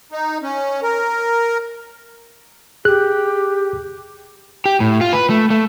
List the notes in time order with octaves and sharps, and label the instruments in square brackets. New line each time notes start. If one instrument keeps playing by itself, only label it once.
[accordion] D#4
C#4
A#4
[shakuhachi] G4 [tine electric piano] G#4 F#6
[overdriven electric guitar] G4
A2
F4
B4
A3
A3